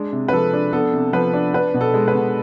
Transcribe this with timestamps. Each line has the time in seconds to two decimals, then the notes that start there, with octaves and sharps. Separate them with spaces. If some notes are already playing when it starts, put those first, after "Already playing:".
Already playing: G#3 D4
0.13 C3
0.28 B4
0.32 F3 A4
0.53 D4
0.73 B3 A4
0.93 C3
1.13 F3 B4
1.33 D4
1.54 D4 B4
1.74 B2
1.81 A4
1.94 G#3
2.08 B4
2.14 B2